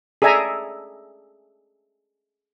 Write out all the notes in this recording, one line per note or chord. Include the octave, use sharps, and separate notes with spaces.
G#4 A4 D5 E5 G#5 A#5